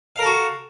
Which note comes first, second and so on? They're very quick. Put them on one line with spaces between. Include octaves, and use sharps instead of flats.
F5 A#4 A4 F#4